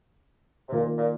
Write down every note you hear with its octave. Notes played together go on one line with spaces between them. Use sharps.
C3
A#2 D#3 A#3 F4
A#2